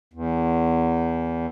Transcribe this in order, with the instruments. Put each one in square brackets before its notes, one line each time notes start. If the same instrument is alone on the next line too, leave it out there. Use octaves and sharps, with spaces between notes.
[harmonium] E2